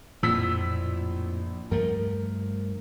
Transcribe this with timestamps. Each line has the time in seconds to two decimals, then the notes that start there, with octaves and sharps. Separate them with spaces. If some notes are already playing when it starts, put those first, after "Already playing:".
0.23 A#1 F2 A2 F3 E6 B6
1.71 G2 F3 A3 A#4